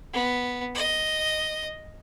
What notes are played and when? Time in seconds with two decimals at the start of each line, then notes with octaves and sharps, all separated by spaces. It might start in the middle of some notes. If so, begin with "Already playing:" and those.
0.13 B3
0.75 D#5